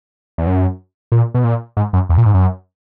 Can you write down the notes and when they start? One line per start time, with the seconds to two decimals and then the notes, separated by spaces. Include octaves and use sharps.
0.38 E2
0.47 F#2
1.12 A#2
1.34 B2
1.44 A#2
1.77 G#2
1.93 F#2
2.09 E2
2.18 A#2
2.26 G#2
2.34 F#2